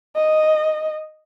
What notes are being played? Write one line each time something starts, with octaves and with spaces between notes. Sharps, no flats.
D#5